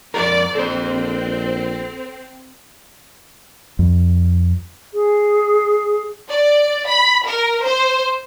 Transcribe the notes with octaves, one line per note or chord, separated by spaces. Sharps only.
F2 A#4 D5
A#1 C4 A4 C5
F2
G#4
D5
B5
A#4
C5